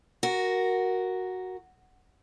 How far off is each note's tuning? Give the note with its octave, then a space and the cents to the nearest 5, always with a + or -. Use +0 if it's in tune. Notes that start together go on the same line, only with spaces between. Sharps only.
F#4 +0 A#4 +0